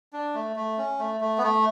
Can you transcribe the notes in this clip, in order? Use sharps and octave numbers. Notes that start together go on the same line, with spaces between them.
D4
A3
A3
C#4
A3
A3
B3
A3